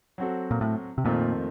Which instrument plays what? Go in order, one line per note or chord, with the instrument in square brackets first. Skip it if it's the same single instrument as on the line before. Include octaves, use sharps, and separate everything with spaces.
[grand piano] F#3 C4 F#4 A4
[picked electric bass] A#2
A2
C3
[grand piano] F2 D#3 A3 C4 F4 [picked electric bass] A#2